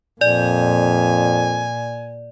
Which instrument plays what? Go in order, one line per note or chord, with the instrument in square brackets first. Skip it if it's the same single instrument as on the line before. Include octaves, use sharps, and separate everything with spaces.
[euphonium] F2 [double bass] A#2 [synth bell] D5 [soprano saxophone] G#5